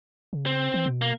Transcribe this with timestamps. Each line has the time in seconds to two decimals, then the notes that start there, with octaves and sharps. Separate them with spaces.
0.33 C#3
0.46 C4
0.74 E3
0.86 B2
1.02 A#3